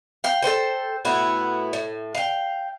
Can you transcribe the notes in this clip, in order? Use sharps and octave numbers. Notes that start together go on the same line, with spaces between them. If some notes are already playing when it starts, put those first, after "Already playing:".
F5 G5
A4 B4 C5 G5
A2 B3 E4 F#4
A2
F5 G5